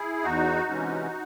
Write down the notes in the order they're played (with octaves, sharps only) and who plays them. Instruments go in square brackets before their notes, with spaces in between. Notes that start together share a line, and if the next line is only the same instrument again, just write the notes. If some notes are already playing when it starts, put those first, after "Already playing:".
Already playing: [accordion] E4 G#4
E2 D#4 F#4
C3 E3 G#3 C#4